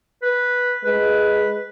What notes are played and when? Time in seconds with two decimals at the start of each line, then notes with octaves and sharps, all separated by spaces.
0.22 B4
0.84 G#3 B4